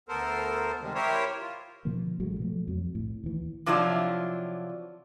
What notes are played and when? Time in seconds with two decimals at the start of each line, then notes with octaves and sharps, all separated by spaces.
0.09 D2 B3 A4 A#4 C5
0.82 C3 D#3 G3 G#3
0.95 E4 G4 A#4 C5 C#5
1.41 F4
1.85 B2 D3 F3 A#3
2.20 A1 F#3 G#3 A3
2.39 B2 F3 F#3 A3
2.68 F2 F#3
2.95 B1 A2
3.24 D#2 E3
3.66 C3 F3 F#3 D4 E4 F4